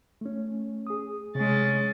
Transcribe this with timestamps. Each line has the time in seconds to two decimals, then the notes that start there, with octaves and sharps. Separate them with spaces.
0.21 A3 C#4
0.87 G#4 D#6
1.35 C3 G#3 C#4 A6